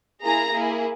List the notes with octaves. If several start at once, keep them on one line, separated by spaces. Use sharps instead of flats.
A#3 E4 G#4 A#5
A#3 E4 G#4